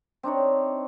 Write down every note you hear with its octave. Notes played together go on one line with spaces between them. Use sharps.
C4 D4 D#4 C#5